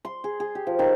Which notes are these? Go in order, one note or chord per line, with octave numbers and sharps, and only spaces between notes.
C6
G#4
G#4
G4
F3
D#3